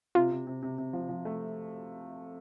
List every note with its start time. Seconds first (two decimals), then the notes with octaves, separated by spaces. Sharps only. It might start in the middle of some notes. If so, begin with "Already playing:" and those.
0.15 C3 F4
0.32 C3
0.47 C3
0.62 C3
0.78 C3
0.93 F3
1.09 F3
1.25 A3